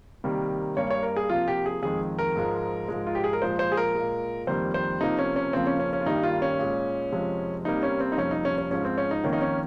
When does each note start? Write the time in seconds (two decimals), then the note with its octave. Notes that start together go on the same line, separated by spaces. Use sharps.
0.24 C3 D#3 G3 A#3
0.77 G2 G3 A#3 C#5
0.90 C#5
1.03 A#4
1.16 G#4
1.30 C3 F3 A#3 F4
1.48 G4
1.66 G#4
1.83 F2 D#3 G#3 G#4
2.19 A#4
2.36 G#2 F3 G#3
2.88 G#2 F3 G#3
3.07 F4
3.15 G4
3.24 G#4
3.33 A#4
3.42 A#2 F3 G#3 C5
3.59 C5
3.72 G#4
3.77 A#4
3.95 A#2 G#3
4.47 F2 D#3 G3 A#3 C5
4.74 C5
5.01 C3 F3 A#3 D#4
5.19 C#4
5.36 C#4
5.53 F2 C#3 F3 A#3 C4
5.67 C#4
5.80 C#4
5.93 C#4
6.00 F4
6.06 G2 D#3 G3 A#3 D#4
6.23 F4
6.42 C#4
6.59 A#2 G#3
7.12 F2 C3 F3 G#3
7.65 C3 G3 A#3 D#4
7.83 C#4
8.00 C4
8.12 D#4
8.18 F2 C3 G3 A#3 C#4
8.31 D#4
8.45 C#4
8.58 C#4
8.71 G#2 F3 G#3 C#4
8.85 C4
8.98 C#4
9.11 D#4
9.24 F2 D#3 A#3 C#4
9.33 D#4
9.41 C#4